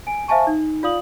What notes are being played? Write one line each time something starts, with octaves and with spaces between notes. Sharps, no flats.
G#5 D7
C5 E5 F5 G#5 A5 C#6
D#4
F4 D5 F5 D#6 F#7